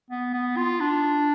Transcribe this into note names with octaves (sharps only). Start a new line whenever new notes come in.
B3
B3
F4
D4